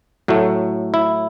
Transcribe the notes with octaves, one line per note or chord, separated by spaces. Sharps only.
A2 F#3 A3
E4